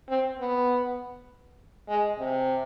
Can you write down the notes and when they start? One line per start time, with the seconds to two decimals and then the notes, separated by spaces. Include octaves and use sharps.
0.09 C4
0.39 B3
1.89 G#3
2.19 C3